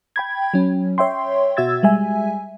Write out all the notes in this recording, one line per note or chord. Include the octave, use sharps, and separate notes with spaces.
G5 B5 G#6
F#3 C#4
C#5 E5 G5 C6
B2 F#4 E5 E6 G#6 A6
G3 G#3 E5 G#5